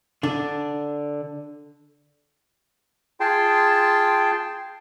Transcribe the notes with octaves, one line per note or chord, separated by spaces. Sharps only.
D3 D4
F4 G#4 G5 A5 C6